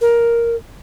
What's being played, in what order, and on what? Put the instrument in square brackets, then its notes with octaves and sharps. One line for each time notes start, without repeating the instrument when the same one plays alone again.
[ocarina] A#4